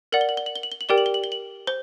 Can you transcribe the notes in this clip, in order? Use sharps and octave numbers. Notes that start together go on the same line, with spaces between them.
A#4 D5 F#5 F#7
G7
F#7
G7
F#7
G7
F#7
G7
F#7
G4 A#4 D5 G5 G7
F#7
G7
F#7
G7
F#7
C5 G7